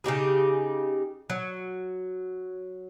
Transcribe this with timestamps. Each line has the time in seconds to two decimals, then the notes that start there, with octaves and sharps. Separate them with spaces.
0.04 C#3 D#4 G4 G#4
1.30 F#3